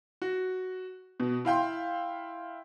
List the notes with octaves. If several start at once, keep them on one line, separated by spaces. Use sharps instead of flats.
F#4
B2
E4 F5 G5 C6